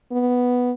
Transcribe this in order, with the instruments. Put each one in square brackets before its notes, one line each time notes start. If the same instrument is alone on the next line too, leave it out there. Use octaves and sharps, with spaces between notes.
[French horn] B3